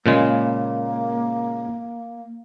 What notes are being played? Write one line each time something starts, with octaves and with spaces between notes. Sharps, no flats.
A#2 C#3 G#3 A#3